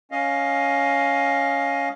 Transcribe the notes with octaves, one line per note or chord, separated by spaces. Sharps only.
C#4 D#5 F5